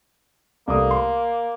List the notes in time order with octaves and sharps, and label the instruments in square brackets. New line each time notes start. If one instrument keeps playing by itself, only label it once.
[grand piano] C2 A3 D#6 [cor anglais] A#3
[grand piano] C6